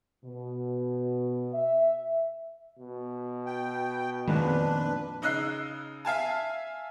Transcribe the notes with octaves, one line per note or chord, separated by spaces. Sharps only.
B2
E5
B2
G5
F2 A#2 D#3 G#3 B3 D4 B4
C#3 D#4 D#5 E6 F#6 C7
E5 F5 G#5 A5